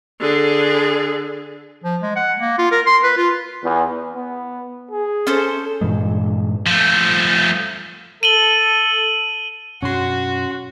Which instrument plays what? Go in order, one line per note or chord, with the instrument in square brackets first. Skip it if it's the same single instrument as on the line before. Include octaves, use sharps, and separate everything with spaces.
[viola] D3 G#4
[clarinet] F3
G#3
F#5
A#3
F4
A#4
C6
B4
F4
[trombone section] E2
[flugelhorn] B3
G#4
[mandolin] C#4 A4 C5
[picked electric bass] G2 A#2 E3 G#3
[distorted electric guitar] F3 A3
[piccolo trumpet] A4 [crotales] D#7 F#7 G7
[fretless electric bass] F#2 B2 D4 [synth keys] C#4 C6 [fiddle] F#4